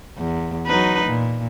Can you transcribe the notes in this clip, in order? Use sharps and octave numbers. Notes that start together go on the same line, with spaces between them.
E2
F#3 D#4 B4
A#2